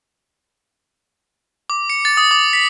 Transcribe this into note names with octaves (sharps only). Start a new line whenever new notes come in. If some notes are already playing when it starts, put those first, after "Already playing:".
D6
C#7
A6
D#6
D6
B6